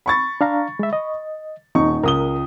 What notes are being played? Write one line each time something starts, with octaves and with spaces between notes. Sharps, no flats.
B5 C#6 A6
D4 F5 A#5
G#3 E5
D#5
D#1 D#4 C#6
C#2 A#4 D#6 G7